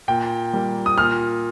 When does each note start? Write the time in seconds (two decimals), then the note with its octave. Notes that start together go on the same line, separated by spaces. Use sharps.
0.08 A#2 G5
0.53 G3 A#3
0.86 D#6
0.98 A#2 F6